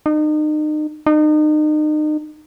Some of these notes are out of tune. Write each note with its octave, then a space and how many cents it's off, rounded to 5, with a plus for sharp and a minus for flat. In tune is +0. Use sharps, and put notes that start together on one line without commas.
D#4 -35
D#4 -35